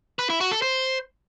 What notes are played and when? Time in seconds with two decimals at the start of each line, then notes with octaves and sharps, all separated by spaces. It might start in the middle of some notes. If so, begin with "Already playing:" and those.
0.19 B4
0.30 E4
0.40 F#4
0.51 A4
0.62 C5